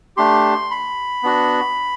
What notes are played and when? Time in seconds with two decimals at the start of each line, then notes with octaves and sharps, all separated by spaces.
0.17 A3 D4 G4 C6
0.71 B5
1.23 B3 D4 F#4